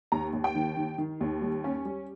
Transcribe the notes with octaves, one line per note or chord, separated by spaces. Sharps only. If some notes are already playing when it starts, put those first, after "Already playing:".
D#2 A#5
D#2
G5
D#3
D#3
D#3
D#2
G3
C#4
G3